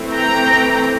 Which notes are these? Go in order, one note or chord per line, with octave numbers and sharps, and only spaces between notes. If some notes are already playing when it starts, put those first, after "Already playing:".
Already playing: E3 A3 C4
G5 A#5